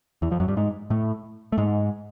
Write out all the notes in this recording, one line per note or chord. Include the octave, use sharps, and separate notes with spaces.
E2 E3
F2 F3
F#2 F#3
G2 G3
G#2 G#3
A2 A3
A3
G#2 G#3